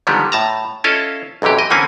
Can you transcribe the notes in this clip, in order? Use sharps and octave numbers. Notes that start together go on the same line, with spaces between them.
D3 D#3 F3 G3 G#3 B3
A2 A5 A#5
C#4 E4 F4 A4 D#5 F5
B1 F#2 C3 E3 G4
D#5
D3 E3 A#3 C4 C#4 G#5